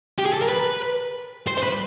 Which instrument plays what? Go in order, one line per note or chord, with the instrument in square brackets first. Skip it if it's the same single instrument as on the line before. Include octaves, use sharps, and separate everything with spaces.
[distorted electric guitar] G4
G#4
A4
A#4
B4
C5
C5
B4